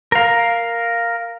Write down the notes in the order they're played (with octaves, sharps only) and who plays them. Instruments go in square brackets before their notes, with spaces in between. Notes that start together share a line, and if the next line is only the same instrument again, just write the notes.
[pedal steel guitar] A#4 F5